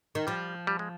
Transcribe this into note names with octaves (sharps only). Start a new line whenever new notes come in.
D#3
F3 G3
G3
G#3